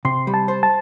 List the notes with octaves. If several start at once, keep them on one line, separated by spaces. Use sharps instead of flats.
C3 C6
G3
A5
C5
A5